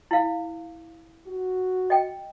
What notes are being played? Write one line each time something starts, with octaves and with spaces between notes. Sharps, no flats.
E4 F5
F#4
D#5 G5